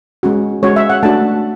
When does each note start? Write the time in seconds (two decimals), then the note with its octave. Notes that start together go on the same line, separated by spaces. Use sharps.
0.23 G#3 C#4 F#4
0.63 G#3 C#4 F#4 C#5
0.76 E5
0.90 F#5
1.03 A3 D4 F#4 A5